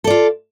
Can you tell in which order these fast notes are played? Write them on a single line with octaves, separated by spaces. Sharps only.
A4 D5 F4